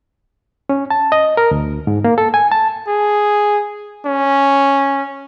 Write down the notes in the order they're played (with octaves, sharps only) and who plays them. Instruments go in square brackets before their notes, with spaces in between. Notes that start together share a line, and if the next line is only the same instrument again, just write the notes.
[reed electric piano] C#4
A5
D#5
A#4
D2
G#2
A#3
A4
G#5
A5
[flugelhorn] G#4
C#4